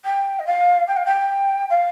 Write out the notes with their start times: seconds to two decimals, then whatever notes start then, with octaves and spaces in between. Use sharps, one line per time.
0.04 G5
0.39 D#5
0.46 F5
0.87 G5
0.96 F5
1.05 G5
1.70 F5